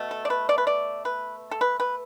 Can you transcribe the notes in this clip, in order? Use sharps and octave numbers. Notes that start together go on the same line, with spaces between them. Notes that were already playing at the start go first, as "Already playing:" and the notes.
Already playing: B2 A3
A4
D5
B4
D5
B4
D5
B4
A4
B4
B4